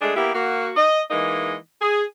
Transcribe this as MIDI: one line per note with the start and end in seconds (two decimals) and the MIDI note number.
0.02 0.14 56
0.02 0.14 57
0.02 0.14 62
0.02 0.14 68
0.16 0.33 58
0.16 0.33 59
0.16 0.33 64
0.16 0.33 67
0.35 0.71 58
0.35 0.71 66
0.77 1.01 75
1.11 1.55 52
1.11 1.55 56
1.11 1.55 58
1.11 1.55 63
1.11 1.55 75
1.82 2.04 68